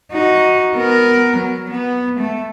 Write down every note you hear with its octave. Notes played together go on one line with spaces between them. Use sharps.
D#4 F#4
B3 A#4
F#3
B3
A3